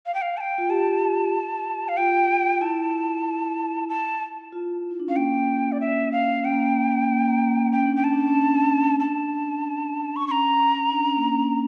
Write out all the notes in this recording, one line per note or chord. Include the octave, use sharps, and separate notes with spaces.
F5
G5
F5
A5
G5
F4
G4 A5
F5
F4 G5
E4 A5
A5
F4
E4
D4
C#4 F5
A#3 G5
D5
E5
F5
C#4 G5
A#3
C#4
A#3
A#3
C#4 G5
D4
G5
C#4 A5
D4
C#4
D4
C#4
D4 A5
C#6
C#4 A#5 C#6
D4
C#4
A#3
C#4